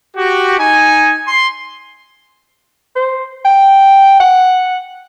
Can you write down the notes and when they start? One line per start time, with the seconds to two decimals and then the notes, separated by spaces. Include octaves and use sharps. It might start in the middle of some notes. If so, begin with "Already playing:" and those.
0.16 F#4 G4
0.58 D#4 G#5
1.27 C6
2.96 C5
3.45 G5
4.20 F#5